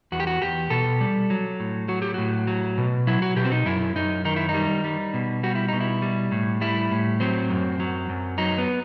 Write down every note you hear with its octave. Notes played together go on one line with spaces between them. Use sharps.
E2 F#4
G4
F#4
E2 G4
B2 A4
G3
F#3
A2
F#3 F#4
G4
A2 F#4
F#3
B2
F#3 E4
F#4
B2 G4
C4
D#4
F#2 E4
F#2 D#4
D#3 D#4
E4
D#4
G3
G3
B2
G3 F#4
E4
B2 D#4
E4
G3
A2
G3 E4
A2
F#3 C4
F#2
F#3
F#2
F#3 D#4
B3